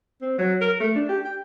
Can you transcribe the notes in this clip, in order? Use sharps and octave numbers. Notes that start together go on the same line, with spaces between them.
C4
F#3
A#4
A3
D4
G4
G5